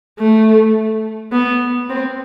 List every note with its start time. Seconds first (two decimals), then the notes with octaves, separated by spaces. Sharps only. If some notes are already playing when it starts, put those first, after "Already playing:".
0.20 A3
1.32 B3
1.90 C4